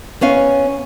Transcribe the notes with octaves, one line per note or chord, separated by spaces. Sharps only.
B3 C#4 F5